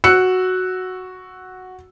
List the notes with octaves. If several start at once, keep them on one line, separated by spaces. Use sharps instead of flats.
F#4 E6 F#6 C#7